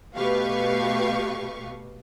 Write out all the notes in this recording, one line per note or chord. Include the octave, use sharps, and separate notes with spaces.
B2 A3 G4 B4 F5 C#6